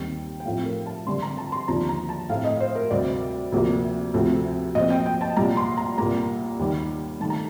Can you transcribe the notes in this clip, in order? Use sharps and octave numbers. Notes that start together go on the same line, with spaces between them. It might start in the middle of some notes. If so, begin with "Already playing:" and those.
Already playing: D#2 D#3 G3 C4 G5
G5
A2 F3 A3 C4 F5
A#4
A5
F2 D3 G3 C4 C6
A#5
A5
C6
D#2 D3 F3 A#5
A#5
A5
A2 A3 C4 F5
D#5
C5
A#4
D2 C3 G3 C4 D5
D2 C3 F3 A#3
D2 C3 F3 A3 C4
A#2 F3 C4 D#5
G5
G5
A5
C2 A#2 G3 A#5
C6
A#5
C2 A#2 G3 A#3 A#5
D#2 D#3 G3
G2 D#3 A3 A5
A#5